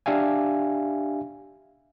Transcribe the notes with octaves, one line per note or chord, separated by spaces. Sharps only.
D4 G4 E5 F5 G#5